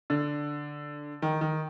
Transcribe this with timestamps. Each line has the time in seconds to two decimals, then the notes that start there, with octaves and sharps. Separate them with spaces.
0.10 D3
1.22 D#3
1.41 D#3